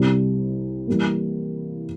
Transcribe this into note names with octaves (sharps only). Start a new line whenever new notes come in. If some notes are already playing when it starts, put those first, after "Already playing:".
Already playing: C2 C3 G3
E3 G3 A#3